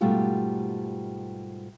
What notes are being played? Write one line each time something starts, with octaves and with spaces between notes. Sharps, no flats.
G#2 B2 G3 A3 F4 G4